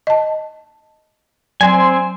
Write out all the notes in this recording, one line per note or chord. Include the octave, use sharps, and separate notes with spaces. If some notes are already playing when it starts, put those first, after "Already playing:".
D#5 A5
F#3 C4 C5 G#5